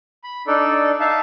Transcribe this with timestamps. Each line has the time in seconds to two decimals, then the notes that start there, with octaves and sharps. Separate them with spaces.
0.24 B5
0.47 D4 D#4 A4 D5
1.00 D#4 E5 F5 A5